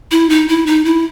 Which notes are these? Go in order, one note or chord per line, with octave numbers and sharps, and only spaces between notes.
E4
D#4
E4
D#4
E4